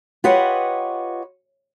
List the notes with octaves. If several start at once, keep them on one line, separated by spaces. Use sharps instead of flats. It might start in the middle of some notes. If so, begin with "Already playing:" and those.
F4 G4 B4 C#5 D#5 F#5